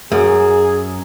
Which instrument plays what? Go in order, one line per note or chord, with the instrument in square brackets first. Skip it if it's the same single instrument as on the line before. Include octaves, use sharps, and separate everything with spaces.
[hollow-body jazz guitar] F#2 [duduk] G#4